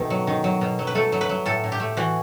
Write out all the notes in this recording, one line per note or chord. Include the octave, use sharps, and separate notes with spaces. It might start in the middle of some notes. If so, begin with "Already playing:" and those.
Already playing: B2 D#3 A3
F#3
D#3
F#3
B2
F#3
B4
A3 A4
F#3
B4
F#3
A2 A4
A2
G4
A3
E3 F#4